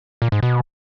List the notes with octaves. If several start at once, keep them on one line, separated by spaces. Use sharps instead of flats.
A#2
G#2
B2